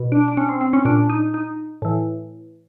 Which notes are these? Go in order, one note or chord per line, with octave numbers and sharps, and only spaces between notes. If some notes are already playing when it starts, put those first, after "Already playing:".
Already playing: B2
D4
D4
C#4
C4
C4
C#4
A#2 D4
D#4
D#4
A2 E3